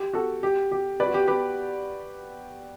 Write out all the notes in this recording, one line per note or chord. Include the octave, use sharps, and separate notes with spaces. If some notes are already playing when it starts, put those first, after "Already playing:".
Already playing: G4
F#4 A4
G4
G4
B4 D5
F#4
G4
G4 B4